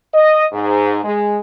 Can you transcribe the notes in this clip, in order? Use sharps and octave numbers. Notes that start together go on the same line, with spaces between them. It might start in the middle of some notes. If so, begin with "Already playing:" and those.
D#5
G#2
G#3